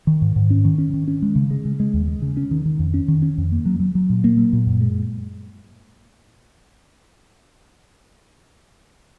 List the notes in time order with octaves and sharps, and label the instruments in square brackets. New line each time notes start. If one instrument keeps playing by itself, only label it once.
[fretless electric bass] D#3
G#2
G#2
C#4
D#3
C#4
D#3
C#4
G#3
C#3
G#3
C#3
G#3
D#2
G#3
C#3
C#4
D#3
D#3
F2
C#4
D#3
C#4
F2
A#3
F#3
F#3
F#3
A#2
A#3
F#3
A#2
F#2
G#3